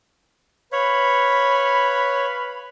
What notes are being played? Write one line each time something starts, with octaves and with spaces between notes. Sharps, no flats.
B4 C#5 F5 B5